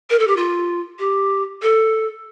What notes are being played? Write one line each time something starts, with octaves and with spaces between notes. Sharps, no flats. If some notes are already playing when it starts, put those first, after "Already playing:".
A#4
A4
G4
F4
G4
A4